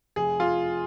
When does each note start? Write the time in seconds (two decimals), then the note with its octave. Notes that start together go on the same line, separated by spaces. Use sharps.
0.16 F1 G#4
0.40 F4